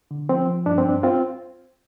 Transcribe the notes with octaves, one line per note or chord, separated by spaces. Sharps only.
D3
F3 C4
F3
G2 D4
C4
G2 D4
C4 F4